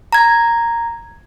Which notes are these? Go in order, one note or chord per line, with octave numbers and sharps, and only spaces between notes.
A#5 G#6